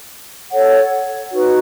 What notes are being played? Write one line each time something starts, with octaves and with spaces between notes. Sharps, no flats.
A4 C#5 F#5
D#4 F#4 B4